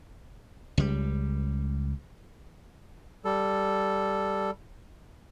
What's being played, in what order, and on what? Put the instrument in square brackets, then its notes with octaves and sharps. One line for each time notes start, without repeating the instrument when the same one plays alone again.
[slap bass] C#2 G3
[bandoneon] G3 A4